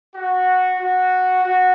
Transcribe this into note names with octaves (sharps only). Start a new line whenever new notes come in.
F#4
F#4
F#4